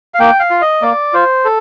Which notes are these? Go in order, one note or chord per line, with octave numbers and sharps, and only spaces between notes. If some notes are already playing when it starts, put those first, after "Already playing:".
F5
A#3 G5
F5
F4
D#5
A#3 D5
F4 C5
A4